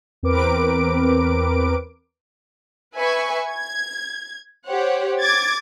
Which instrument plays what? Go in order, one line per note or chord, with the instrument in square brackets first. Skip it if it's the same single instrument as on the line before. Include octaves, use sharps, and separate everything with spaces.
[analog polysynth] E2 C4 A#4 B4 D6 D7
[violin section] B4 E5 G#5 C#6
G#6
G4 C5 C#5 F#5
D6 G#6 A6